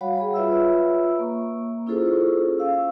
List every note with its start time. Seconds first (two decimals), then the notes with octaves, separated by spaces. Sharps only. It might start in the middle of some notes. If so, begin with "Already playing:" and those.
0.01 G3 F#4 C#5 F5 F#5 B5
0.18 G#4 B5
0.34 F4 B4 C#5 E5 B5 E6
1.19 A#3 C#6
1.87 C#4 E4 F4 G#4 A4 C5
2.58 C#4 F5 E6